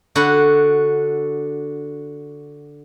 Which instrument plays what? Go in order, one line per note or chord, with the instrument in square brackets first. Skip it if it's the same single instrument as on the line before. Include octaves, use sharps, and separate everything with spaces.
[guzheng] D3 F#4 B5